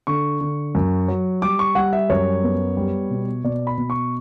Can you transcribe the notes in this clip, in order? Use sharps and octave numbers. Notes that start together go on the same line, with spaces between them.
D3 C#6
D3
F#2
F#3
G3 D6
C#6
G3 F#5
E5
F#2 C#5
B3
G3
B2
B2 D5
B5
B2
C#6